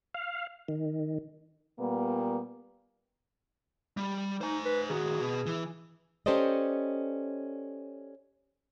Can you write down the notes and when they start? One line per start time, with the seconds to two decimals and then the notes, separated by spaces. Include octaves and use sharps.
0.14 F5
0.68 D#3
1.79 A#2 G3 A#3 B3
3.97 G3
4.41 D#4 C5 G#5
4.65 B4
4.90 D#3 F#4 G#4
5.21 B2
5.46 E3
6.26 C#4 G4 A4 C5 D5 D#5